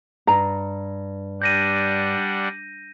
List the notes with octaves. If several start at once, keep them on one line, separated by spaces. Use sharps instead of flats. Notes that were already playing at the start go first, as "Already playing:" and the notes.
G2 A#5
G3 D4 F#5 G6 A#6 D#7